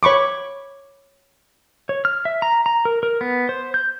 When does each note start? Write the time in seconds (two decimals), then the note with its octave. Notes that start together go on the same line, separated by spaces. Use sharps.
0.03 C#5 B5 C#6 D6
1.89 C#5
2.05 F6
2.25 E5
2.42 A#5
2.66 A#5
2.85 A#4
3.03 A#4
3.21 B3
3.49 C5
3.74 G6